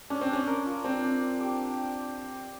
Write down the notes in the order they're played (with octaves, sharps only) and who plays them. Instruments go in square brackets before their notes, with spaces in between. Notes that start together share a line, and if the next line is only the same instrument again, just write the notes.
[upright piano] C#4 [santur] D4
[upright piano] C4
[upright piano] C#4 [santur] D4
[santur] A#4
F4
[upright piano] C4 [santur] D4
[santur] D4
C5
G4